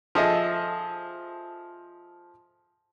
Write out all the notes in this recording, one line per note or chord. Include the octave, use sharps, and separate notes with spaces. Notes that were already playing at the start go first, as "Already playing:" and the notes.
F3 G#4 A4 D#5 E5